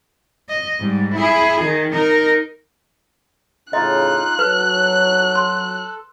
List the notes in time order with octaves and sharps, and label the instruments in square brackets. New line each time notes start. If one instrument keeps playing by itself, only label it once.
[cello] D#5
G#2 G3
E4 G#4
D#3
D#4 A#4
[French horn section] A2 C#3 [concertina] D#4 F4 [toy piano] D#5 [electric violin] F#6
[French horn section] F#3 [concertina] A4 [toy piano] B4
[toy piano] C6